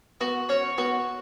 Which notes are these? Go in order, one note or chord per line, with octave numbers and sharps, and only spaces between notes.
B3 F#4
C#4 C#5
B3 F#4